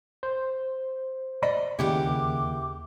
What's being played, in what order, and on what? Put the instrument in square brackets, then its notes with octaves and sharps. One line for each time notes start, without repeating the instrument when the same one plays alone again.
[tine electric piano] C5
[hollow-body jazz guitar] D5 D#5 B5
[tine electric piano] D#2 [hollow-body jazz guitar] C#3 [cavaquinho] E4 G4 F#5 [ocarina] D6